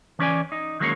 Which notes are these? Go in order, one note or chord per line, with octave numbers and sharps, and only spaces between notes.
E3 C#4 D5 G#5
D#4
D#3 F#3 G#3 A#3 C#4 C#5